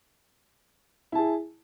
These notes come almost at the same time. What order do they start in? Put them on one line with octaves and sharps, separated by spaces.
E4 A5 G#4